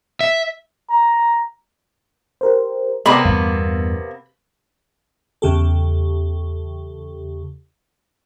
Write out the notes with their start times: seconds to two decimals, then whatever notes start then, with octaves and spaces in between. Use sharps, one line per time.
0.21 E5
0.90 A#5
2.41 G4 A#4 C5
3.06 C3 A#3 B3 A4 D5 G5 B5
3.25 E2 G2 G3 F5
5.42 E2 C#3 G4 A4